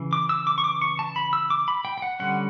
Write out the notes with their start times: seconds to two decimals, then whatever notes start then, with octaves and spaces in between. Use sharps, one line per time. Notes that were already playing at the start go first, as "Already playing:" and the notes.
Already playing: C#3 E3
0.13 D6
0.29 E6
0.47 D6
0.58 C#6
0.64 D6
0.82 C#6
0.99 A5
1.16 B5
1.33 E6
1.50 D6
1.68 B5
1.85 G5
1.98 G5
2.02 F#5
2.20 D3 G3 C#4 F#5